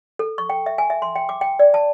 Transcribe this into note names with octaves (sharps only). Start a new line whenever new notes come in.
A4
C#6
G5
E5
G#5
E5
C6
G5
D6
G5
D5
A5